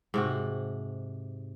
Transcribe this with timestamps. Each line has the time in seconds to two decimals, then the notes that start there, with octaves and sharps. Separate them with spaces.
0.14 G#2 C3 F#4